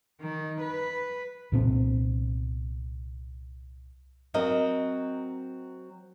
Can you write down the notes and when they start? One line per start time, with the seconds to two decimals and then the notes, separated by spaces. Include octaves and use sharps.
0.21 D#3
0.61 B4
1.52 C2 A#2 C4
4.34 F#3 C4 A#4 D#5